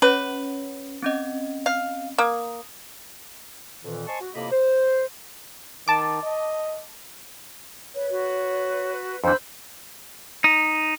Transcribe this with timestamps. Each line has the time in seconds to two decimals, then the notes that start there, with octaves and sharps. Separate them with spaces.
0.02 C#4 B4 C#5
1.02 C4 C#4 D#5
1.66 F5
2.18 A#3 D#6
3.84 F2 A#2 D#3 E3
4.07 C5 D#5 G#5 A5 C6 C#6
4.21 F#4
4.35 F2 A2 C3 A#3 D#5 B5
4.51 C5
5.88 D#3 A5 D6
6.23 D#5
7.95 B4 C#5
8.11 F#4 B4
9.24 F2 E3 D4 C5 B5 E6 G6
10.44 D#4